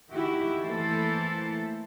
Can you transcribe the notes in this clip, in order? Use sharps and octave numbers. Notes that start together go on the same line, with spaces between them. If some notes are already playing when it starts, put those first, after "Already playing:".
D#3 E4 F#4 G4
E3 A3 A#3 E4 A4 C5